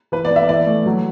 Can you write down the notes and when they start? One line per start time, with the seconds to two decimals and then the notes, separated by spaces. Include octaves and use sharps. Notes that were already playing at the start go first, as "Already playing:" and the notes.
0.12 E3 B4
0.25 D5
0.30 B3
0.36 E5
0.48 E3 D5
0.66 A3
0.86 F#3